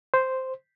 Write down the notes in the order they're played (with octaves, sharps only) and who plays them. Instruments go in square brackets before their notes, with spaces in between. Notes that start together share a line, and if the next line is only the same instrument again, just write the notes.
[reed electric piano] C5